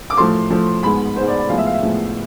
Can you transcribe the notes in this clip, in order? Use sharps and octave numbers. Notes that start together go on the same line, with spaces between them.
D6
A2 F3 A3 C6
A2 F3 A3
G#2 G#3 B3 B5
G#2 G#3 B3 C5
D5
D5
A2 F3 G#3 B3 F5
E5
F5
E5
A2 F3 G#3 B3